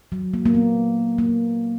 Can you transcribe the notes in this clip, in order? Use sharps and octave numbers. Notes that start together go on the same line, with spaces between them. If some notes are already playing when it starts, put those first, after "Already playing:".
F#3
A#3
A#3
B3
A#3